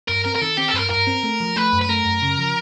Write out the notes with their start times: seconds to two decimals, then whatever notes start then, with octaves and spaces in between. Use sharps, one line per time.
0.08 G2 A#4
0.25 C4 A#4
0.36 A#4
0.41 D#3 A4
0.57 C4 G4
0.68 A4
0.74 G2 B4
0.79 A#4
0.90 G2 A#4
1.07 C4
1.23 A3
1.40 F3
1.56 A3 B4
1.73 F#2
1.81 B4
1.89 A3 A#4
2.05 F#2
2.22 C#3
2.39 F3